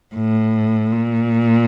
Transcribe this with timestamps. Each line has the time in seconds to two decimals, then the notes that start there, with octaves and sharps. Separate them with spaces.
0.15 A2
0.92 A#2